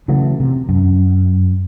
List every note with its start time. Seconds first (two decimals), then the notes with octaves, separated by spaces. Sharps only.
0.08 C#3 E3 F#3 A3
0.40 C3
0.69 F#2